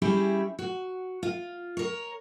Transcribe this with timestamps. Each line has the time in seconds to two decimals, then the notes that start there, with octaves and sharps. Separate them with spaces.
0.02 G3 C#4 E4 G4 G#4
0.59 F#4
1.23 F4
1.77 A#4 C#5